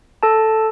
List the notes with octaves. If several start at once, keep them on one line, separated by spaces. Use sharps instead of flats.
A4 A5